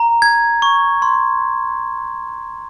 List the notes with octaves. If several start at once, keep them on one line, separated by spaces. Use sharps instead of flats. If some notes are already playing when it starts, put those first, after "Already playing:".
Already playing: A#5
G#6
C#6
C6